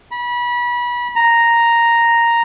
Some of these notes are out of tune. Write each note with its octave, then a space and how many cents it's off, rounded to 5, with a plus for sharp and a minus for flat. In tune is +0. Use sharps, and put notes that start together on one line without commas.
B5 -30
A#5 +0